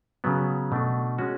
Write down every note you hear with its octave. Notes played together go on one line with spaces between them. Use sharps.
C#3 F#3 B3
B2 A3 D4
G#3 C#4 F#4